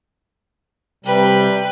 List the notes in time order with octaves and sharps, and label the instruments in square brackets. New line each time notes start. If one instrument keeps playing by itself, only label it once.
[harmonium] C3 G3 [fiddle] B4 G5